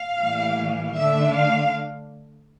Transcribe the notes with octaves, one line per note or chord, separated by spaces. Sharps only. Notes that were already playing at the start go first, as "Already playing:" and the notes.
Already playing: F5
A2 E3 G3 A#3
D3 A3 D4 E5
F5